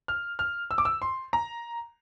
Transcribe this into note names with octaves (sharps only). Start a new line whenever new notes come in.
F6
F6
E6
D6
E6
C6
A#5